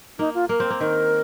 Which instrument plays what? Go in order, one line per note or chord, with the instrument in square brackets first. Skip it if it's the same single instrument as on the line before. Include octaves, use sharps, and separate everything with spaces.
[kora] A#3 [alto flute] D#4
[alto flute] F4
[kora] A#3 [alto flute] A#4
[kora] C4
A#3
[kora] D#3 [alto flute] A#4